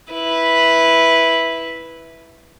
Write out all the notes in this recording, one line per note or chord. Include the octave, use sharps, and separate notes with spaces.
E4 B4